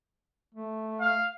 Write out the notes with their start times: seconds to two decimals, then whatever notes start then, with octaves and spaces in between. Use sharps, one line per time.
0.55 A3
1.01 F5